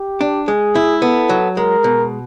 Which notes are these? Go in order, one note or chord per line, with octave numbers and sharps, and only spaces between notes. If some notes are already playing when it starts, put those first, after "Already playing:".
Already playing: G4
D4
G#3 G#4
E4
B3 A4
F#3
G#3 A#4
B2